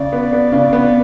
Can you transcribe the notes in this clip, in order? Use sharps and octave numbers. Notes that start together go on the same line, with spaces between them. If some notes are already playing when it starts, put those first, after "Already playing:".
Already playing: C#3 D5
B3
B3
C#3
B3